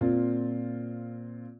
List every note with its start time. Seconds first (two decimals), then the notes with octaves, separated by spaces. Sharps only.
0.01 A#2 C4 F4